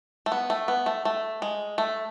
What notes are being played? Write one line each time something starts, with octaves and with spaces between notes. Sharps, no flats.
A3
B3
A3
B3
A3
A3
G#3
A3